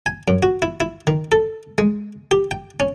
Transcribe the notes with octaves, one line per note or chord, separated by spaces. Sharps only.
G#5
F#2
F#4
E4
E4
D#3
A4
G#3
G4
G5
C#4